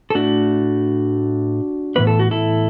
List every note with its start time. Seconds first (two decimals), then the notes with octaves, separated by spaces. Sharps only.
0.10 A4
0.15 A2 A3 D4 F#4
1.95 A2 E3 B3 B4
2.07 A4
2.19 F#4
2.31 E4 A4